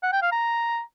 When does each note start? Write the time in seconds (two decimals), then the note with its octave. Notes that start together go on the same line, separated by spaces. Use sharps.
0.03 F#5
0.12 G5
0.22 F5
0.32 A#5